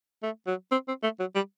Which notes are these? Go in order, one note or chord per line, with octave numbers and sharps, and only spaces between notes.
A3
F#3
C4
C4
A3
F#3
G3